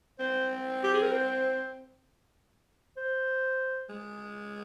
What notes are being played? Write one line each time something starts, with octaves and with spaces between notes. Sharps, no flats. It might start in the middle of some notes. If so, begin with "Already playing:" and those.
C4 C5
G4
G#4
A#4
C5
C5
G#3